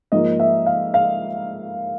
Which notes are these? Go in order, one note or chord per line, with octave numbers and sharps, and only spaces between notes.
G#2 F3 A#3 D#5
E5
F5
F5